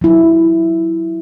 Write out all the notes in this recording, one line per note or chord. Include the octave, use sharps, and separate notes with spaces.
F#3 E4